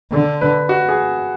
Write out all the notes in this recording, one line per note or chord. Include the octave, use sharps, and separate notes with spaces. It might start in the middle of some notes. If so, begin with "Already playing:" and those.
D3 A4
B4
F#4
G#4